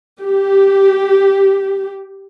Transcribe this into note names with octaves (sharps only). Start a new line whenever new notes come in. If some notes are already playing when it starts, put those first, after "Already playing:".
G4